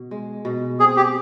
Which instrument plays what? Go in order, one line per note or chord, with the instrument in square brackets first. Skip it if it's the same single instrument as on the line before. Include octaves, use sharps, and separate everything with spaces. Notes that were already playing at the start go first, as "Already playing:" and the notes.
Already playing: [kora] B2
G#3
B2
[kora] C4 [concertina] G#4
[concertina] G4